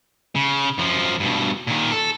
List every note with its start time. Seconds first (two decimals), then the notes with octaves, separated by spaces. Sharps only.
0.35 C#3
0.78 F#2 F3
1.20 G2 B2
1.67 A#2 D#3
1.92 A4